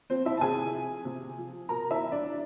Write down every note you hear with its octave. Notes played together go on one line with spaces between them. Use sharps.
F3 C4 C5
E4 E5
A5
C3 G#4 G#5
F3
C3
F3
B2 A#4 A#5
E4 E5
F#3
D4 D5